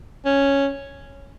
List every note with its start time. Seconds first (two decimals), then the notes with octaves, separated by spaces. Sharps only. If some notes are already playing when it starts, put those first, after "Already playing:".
0.25 C#4